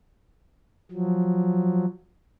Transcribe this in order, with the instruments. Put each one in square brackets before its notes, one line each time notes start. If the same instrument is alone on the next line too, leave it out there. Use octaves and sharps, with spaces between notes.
[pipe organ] F3 F#3